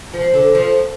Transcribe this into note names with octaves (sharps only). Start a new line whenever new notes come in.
F3
D3
F3